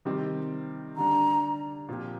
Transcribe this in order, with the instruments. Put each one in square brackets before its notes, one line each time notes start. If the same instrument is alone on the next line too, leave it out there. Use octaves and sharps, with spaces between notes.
[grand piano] C3 D#3 G3 C4 G4
[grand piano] D3 G3 D4 [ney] A#5
[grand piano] A#2 F3 C4 G4